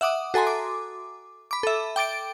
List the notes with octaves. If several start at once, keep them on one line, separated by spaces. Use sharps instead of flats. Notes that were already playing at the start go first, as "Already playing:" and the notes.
E5 F#5 D6 D#6
F#4 A4 G#5 A#5 C6
D6
B5 D6
A4 E5
G5 D6 A6 D7